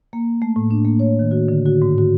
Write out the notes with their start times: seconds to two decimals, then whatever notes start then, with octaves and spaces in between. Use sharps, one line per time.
0.13 A#3
0.42 A3
0.56 A2
0.71 D4
0.85 A#3
1.00 C#5
1.19 D#3
1.31 F#4
1.48 D3
1.66 F#4
1.82 G#2
1.98 F#4